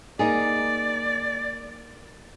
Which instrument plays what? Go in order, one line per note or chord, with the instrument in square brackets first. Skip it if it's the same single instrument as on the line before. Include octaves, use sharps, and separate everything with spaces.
[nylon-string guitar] A#3 D#4 G#4 [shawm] D5